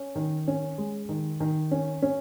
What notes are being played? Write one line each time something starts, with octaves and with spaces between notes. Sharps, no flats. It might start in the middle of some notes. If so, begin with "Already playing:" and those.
Already playing: C#4
D#3
C#4
G#3
D#3
D#3
C#4
C#4